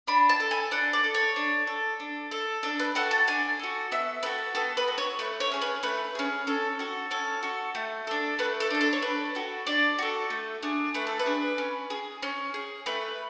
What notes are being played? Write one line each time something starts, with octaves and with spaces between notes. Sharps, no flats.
D4 B5
A5
A4
G#5
D4 F#5
D5
A4
C#5
D4
A4
D4
A4
D4 A4
B4
F#4 A4 F#5
A5
D4 G#5
F#4 A4
B3 E5
F#4 A4 B4
B3 A4
B4
F#4 A4
C#5
A3 B4
C#5
C#4 G#4
B4
A3 B4
C#4 G#4
C#4 A4
F#4 A4
C#4 A4
F#4 A4
A3
D4 A4
A3 B4
A4
D4 A4
A4
C#5
D4 B4
F#4 A4
D4 D5
F#4 A4
A3
D4 G#4
A3 B4
A4
B4
D4 G#4
C#4
G#4
C#4
G#4
A3 B4